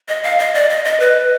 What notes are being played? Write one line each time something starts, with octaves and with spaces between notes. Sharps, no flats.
D#5
F5
D#5
D5
D#5
D#5
B4